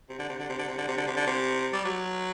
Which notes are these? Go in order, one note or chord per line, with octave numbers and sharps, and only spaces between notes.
C3
D3
C3
D3
C3
D3
C3
D3
C3
D3
C3
D3
C3
G3
F#3